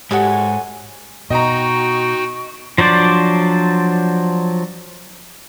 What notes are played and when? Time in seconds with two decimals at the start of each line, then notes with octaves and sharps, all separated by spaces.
0.11 G#2 F#4 G4 A4 C#5 G#5
1.30 B2 D#4 F#4 D#5 G5 A#5 C#6
2.78 F3 F#3 D4 C5 D5